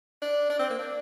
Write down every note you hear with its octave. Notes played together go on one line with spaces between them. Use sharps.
D4
D4
C4
A#3
D4